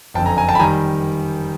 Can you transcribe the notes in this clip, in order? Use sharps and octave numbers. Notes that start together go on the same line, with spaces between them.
F#1 F2 D3 G5 A5
G#5 A#5
G#5 A#5
G5 A5
B5
D#3 G3 G#5 A#5